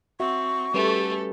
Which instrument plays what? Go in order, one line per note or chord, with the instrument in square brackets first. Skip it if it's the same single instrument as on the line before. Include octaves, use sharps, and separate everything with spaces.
[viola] C4 [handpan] F#4 E5 [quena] C#6
[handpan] G3 C#4 B4 [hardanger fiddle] A3 [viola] G4 A4